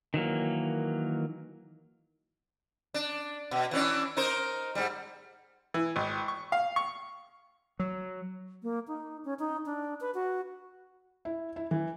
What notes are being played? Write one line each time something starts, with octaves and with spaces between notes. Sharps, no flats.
D#3 E3 F#3 A#3
D4
B2
E3 C#4 D4
D#4 A#4 C5
G#2 G3
E3
G#1
C#6
F5
C#6
F#3
A#3
D#4
C#4
D#4
D4
B4
F#4
E4
E4
E3